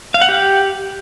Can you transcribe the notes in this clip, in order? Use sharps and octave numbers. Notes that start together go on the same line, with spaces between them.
F5
F#5
G4